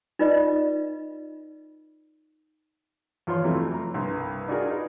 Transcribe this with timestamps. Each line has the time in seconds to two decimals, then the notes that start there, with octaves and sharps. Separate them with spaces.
0.19 D#4 F4 B4 D5 D#5
3.27 E2 F3 F4 C#5 C6
3.44 F2 C3 E3 F#3 A3
3.74 A#5
3.94 C2 G2
4.48 D4 D#4 F4 F#4 G#4 A#4
4.70 D#4 B4